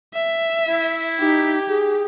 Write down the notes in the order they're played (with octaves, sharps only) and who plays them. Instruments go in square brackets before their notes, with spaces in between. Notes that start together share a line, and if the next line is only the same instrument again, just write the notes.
[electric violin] E5
[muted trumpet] E4
[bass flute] D#4 [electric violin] G4
[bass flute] G#4